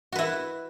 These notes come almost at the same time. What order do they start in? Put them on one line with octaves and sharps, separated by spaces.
F#4 B4 E4